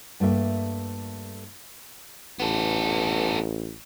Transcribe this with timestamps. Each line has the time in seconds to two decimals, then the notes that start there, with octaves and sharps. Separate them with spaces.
0.20 G2 A3 A#3 E5
2.40 A1 B3 A4